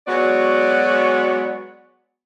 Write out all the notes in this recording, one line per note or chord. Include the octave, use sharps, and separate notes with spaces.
F#3 G#3 B3 F#4 C#5 D5